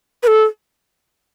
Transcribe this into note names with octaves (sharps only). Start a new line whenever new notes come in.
B4
A4